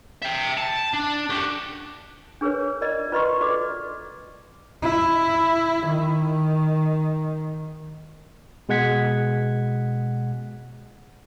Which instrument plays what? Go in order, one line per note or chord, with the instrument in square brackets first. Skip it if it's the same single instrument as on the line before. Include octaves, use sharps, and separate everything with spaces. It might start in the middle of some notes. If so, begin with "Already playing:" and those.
[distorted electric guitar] E5 G5
A5
D4
F#4 G4
[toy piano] D4 G#4 A#4 B4 C#5
F4 A#4 D5 D#5
F4 B4 D#5 C6 C#6
F#4 A4 B4 D5 D6
[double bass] E4
D#3
[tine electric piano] B2 G#3 G#4 F#5 G#6 B6